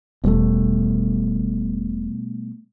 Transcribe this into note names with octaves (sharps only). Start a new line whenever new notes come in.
E1 B2 G3 A3